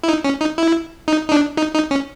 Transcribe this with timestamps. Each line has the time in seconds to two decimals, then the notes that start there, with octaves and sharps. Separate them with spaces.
0.03 E4
0.08 D#4
0.24 C#4
0.40 D#4
0.58 E4
1.08 D#4
1.28 D#4
1.32 D4
1.58 D#4
1.74 D#4
1.91 C#4